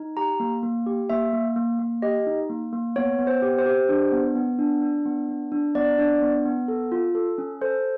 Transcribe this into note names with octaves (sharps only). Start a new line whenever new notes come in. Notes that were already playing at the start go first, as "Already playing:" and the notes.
Already playing: D#4
G4 A#5
A#3
A#3
G4
A#3 E5
A#3
A#3
A#3
G4 D#5
D#4
A#3
A#3
B3 C#5
B3
C5
G4
C5
G4
D4
B3
B3
D4
D4
B3
D4
D4
B3 D5
D4
B3
B3
A4
F4
A4
C#4
A4 C5